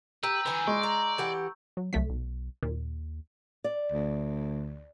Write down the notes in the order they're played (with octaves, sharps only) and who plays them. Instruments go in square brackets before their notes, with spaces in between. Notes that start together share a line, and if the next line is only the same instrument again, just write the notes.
[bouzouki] G4 [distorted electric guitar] B4 [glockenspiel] A#5 E6 G6
[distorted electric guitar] D3 E3 [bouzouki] B4 G#5
[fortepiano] G#3 [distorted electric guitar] D5 [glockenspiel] C#6
[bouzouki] A#5
E3 G4 F#5
[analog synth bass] F#3
[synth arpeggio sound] C2 A3 B6 [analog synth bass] F#3
[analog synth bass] B1
[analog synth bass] D#2 [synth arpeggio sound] A#2
[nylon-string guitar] D5
[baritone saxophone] D2